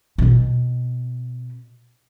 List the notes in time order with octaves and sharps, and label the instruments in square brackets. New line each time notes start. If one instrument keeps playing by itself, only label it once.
[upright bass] B2 C4